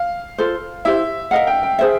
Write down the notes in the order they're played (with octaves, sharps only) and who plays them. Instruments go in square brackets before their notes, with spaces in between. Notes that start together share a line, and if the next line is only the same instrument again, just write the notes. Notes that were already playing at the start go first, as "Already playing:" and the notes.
Already playing: [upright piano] F5
[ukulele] F4 A4 C5
[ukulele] E4 G4 C5 [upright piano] E5
[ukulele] A#4 D#5 F#5 [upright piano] F5
[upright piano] G5
G5
[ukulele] G#4 C5 E5